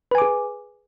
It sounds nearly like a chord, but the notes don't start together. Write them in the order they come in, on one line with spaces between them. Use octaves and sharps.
B4 G#5 D6 G#4